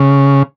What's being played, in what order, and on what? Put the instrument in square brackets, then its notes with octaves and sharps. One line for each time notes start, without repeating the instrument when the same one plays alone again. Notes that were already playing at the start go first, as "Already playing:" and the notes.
Already playing: [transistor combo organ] C#3